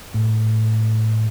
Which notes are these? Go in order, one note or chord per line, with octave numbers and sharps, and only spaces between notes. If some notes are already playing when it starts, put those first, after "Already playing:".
A2